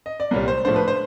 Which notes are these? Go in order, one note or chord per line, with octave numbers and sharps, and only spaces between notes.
D#5
D5
C2 A#2 G3 C#5
C5
A2 F3 A3 D4 C5
B4
C5